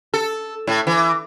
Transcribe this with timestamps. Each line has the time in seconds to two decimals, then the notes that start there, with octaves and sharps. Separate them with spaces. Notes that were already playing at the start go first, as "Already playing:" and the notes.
0.14 A4
0.67 A2
0.87 E3